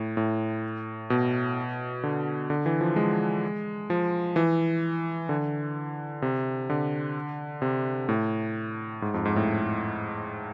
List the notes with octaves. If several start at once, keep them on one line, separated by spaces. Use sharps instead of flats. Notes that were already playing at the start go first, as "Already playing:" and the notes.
Already playing: A2
A2
B2
D3
D3
E3
F3
G#3
F3
E3
D3
C3
D3
C3
A2
G#2
F2
G#2
A2